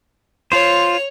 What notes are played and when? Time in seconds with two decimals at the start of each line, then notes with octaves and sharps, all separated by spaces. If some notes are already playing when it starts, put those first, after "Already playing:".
0.52 F4 C5 C#5 F7